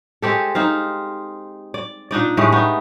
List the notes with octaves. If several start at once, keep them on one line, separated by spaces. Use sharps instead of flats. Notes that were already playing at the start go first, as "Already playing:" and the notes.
G#3 C4 G4 A4
C4 D#4 F5
D5
A#2 D4 D#4 D5
A2 G#3 A3 G4
B3 D#4